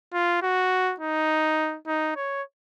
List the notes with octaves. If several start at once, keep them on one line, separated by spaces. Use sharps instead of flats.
F4
F#4
D#4
D#4
C#5